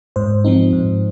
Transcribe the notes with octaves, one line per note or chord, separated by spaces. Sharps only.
G#2 C5
F3 C4 D#4
G#2